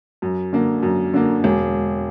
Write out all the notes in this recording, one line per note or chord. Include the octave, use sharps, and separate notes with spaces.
F#2
D3 A#3
F#2
D3 A#3
E1